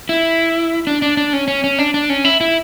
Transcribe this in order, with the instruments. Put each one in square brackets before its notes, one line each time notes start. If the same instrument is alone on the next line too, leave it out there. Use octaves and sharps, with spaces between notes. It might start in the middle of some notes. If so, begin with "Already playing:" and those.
[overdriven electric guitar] E4
D4
D4
D4
C#4
C#4
C#4
D4
D4
C#4
E4
E4